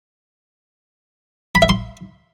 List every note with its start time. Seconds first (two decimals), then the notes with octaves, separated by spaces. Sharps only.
1.55 B5
1.62 E5
1.69 C6